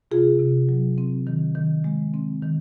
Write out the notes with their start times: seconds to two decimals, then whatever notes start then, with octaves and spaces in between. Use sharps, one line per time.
0.11 C3 F4 G#4
0.39 C3
0.69 F#3
0.98 C4
1.27 D#3
1.55 D#3
1.84 G#3
2.14 C4
2.43 D#3